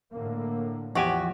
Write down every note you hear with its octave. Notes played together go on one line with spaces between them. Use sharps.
A2 D3 A#3
E2 F3 F#4 G4 G#5